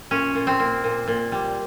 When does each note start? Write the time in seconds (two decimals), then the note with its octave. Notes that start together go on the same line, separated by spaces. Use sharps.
0.11 A#2 C#4
0.35 A#2
0.47 C4
0.60 A#3
0.84 A#2
1.08 A#2
1.32 G3